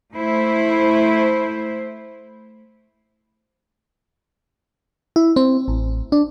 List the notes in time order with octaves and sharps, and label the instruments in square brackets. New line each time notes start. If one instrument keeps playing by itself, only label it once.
[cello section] A3 E4 C5
[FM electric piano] E4
C4
A1
D4